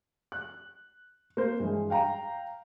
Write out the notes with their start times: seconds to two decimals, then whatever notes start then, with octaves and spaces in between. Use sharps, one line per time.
0.32 F#6
1.37 A#3 C5
1.60 G2 E3 G#3
1.90 F5 G5 A#5